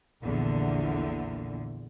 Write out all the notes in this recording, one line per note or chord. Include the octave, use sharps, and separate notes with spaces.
A#1 E2 A#2 D3